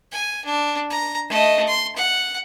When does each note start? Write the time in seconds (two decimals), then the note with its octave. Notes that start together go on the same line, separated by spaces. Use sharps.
0.12 G#5
0.45 D4
0.90 A#5
1.29 A3 D#5
1.68 C6
1.96 F#5